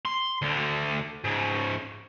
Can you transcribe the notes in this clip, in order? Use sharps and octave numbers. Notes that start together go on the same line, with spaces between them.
C6
D2 D3
G#2 C#3